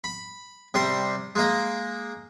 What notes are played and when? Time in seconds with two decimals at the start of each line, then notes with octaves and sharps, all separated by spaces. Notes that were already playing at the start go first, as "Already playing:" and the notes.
0.04 B5
0.74 C3 G3 C6
1.35 G#3 A#3 D#5